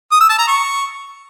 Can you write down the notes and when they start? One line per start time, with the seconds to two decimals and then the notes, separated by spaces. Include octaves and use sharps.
0.12 D#6
0.21 E6
0.30 A5
0.39 A#5
0.48 C#6